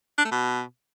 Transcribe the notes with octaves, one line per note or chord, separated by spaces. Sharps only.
D4
A3
B2